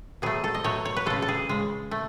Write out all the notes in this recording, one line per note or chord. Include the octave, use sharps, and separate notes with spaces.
B2 F#3 A3 G#4
A4
D#5
B2 F#3 A3 C#5
C#5
B4
C#3 G#3 A4
A4
G#4
C#3 G#3
A3